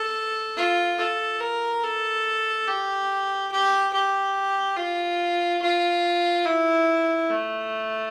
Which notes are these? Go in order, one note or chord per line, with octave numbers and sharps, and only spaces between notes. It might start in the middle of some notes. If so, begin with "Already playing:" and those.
Already playing: A4
F4
A4
A#4
A4
G4
G4
G4
F4
F4
E4
A3